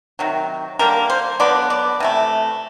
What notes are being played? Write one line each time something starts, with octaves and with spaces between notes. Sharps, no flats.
C3 D#3 F#3
D3 G3 A#3 A#4
C5
D3 F#3 B3 D5
D5
C3 E3 A3